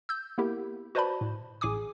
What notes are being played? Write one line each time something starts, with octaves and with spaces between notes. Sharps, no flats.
E6 G6
A#3 B3 E4 G4 A#4
F#4 B4 C5 D5 A5 B5
A2
A1 A2 G#4 G#5 D6 D#6